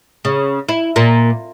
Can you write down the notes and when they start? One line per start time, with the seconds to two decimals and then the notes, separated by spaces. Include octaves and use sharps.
0.25 C#3
0.69 E4
0.96 A#2